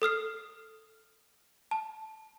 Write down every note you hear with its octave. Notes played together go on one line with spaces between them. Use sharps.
A4 D#6 F6 C7
A5